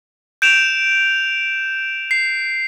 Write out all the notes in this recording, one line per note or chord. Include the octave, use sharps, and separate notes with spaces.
G6 D7 E7 F7
C7